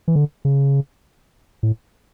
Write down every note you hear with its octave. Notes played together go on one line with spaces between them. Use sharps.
E3
D3
C#3
A2